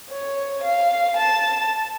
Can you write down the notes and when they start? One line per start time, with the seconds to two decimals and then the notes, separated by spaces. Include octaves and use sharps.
0.11 C#5
0.63 F5
1.17 A5